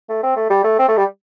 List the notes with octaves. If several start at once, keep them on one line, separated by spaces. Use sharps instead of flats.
A3
C4
A3
G3
A3
C4
A3
G3